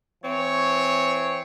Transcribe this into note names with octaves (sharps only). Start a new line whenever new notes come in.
E3 C4 C#5